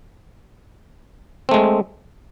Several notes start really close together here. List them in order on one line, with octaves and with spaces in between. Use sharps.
C4 A3 G#3